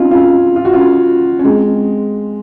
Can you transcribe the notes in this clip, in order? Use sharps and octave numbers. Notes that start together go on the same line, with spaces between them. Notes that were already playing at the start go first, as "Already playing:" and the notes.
Already playing: C4 C#4 D#4 F4
C#4 F4
F4
F#4
C#4 F4
C#4
G#3 C4